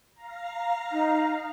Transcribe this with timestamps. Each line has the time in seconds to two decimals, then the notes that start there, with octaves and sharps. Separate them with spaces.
0.14 F5 A#5
0.92 D#4